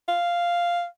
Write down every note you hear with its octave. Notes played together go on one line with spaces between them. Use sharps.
F5